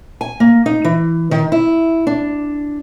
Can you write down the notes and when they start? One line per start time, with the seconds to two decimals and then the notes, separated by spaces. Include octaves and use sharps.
0.21 G#5
0.40 A#3
0.66 D#4
0.84 E3
1.31 D#3
1.52 E4
2.07 D4